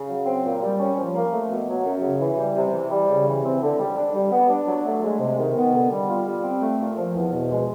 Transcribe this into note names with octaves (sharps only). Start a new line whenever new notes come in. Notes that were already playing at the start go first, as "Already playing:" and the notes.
Already playing: C#3
F#3
C4
A#2
G3
C#4
F3
A#3
A3
B2
F#3
F#2
C#3
E3
G3
C3
E3
G3
C#3
E3
C4
D3
G3
D4
G3
B3
D4
F#3
A3
G#3
C3
D#3
B3
D3
G3
F4
G3
C4
A3
A#2
F3
E2
B2
G#3